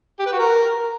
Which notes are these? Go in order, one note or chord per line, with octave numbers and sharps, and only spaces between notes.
G4
B4
F#4
A#4